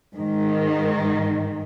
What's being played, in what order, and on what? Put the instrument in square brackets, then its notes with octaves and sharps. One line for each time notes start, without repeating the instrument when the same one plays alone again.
[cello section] G#2 D#3